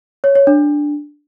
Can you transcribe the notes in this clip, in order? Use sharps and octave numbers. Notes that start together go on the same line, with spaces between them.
C#5
C#5
D4